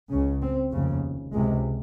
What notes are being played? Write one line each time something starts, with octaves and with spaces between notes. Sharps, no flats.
C#2 C#3 C#4
C4
F1 D#2 C#3
C#2 C3 G#3